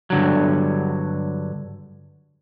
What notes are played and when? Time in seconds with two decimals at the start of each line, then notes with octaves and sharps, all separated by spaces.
0.10 G2 D3 F#3